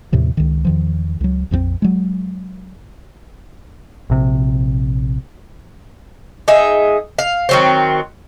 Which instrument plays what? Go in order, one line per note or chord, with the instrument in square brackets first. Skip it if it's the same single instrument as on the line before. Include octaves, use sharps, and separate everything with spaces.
[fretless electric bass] D#2 A2 C3 F3
C#2 D#3
E2 D#3 F3
C#2 F#3
A#1 F2 D3 C4
F#3 G#3
[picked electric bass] A#1 C3
[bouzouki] D#4 G#4 E5
F5
D#3 F#3 C4